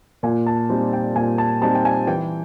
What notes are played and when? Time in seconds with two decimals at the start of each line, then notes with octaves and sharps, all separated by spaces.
0.23 A#2 G#5
0.47 A5
0.69 G3 C4 D#4
0.93 G5
1.16 A#2 G#5
1.38 A5
1.62 G3 C4 D#4 A5
1.75 G5
1.85 G#5
2.07 E3 G5